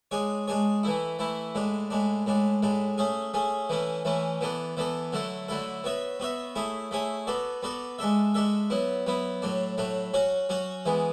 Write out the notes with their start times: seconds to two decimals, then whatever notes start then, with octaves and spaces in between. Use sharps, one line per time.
0.11 G#3 D4 G#4 C#5
0.48 G#3 D4 G#4 C#5
0.83 E3 A3 E4
1.19 E3 A3 E4
1.55 A2 G#3 D4
1.90 A2 G#3 D4
2.26 A2 G#3 D4
2.63 A2 G#3 D4
2.98 A3 C#4 G#4
3.34 A3 C#4 G#4
3.69 E3 A3 C#4
4.05 E3 A3 C#4
4.41 E3 B3 D4 A4
4.77 E3 B3 D4 A4
5.13 D3 F#3 A3 E4 A4
5.48 D3 F#3 A3 E4 A4
5.84 B3 F#4 C#5 E5
6.20 B3 F#4 C#5 E5
6.55 A3 E4 G#4 C#5
6.91 A3 E4 G#4 C#5
7.27 B3 F#4 A4 D5
7.62 B3 F#4 A4 D5
7.99 G#3 D4 A4 E5
8.34 G#3 D4 A4 E5
8.70 F#3 B3 E4
9.06 F#3 B3 E4
9.42 A2 F#3 A3 D4
9.78 A2 F#3 A3 D4
10.14 F#3 C#4 F#4 C#5
10.49 F#3 C#4 F#4 C#5
10.85 E3 G#3 B3